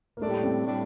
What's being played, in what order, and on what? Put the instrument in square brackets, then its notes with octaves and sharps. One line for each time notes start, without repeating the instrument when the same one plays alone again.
[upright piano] A#3
[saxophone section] A2 G3 D4 [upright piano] A3
[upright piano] C4
[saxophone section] A2 G3 D4